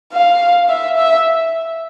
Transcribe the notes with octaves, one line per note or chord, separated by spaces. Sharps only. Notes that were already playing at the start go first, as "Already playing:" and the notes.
F5
E5
E5